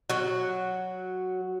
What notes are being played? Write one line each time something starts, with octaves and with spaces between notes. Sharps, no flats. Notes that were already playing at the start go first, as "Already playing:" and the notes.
F#3 F#4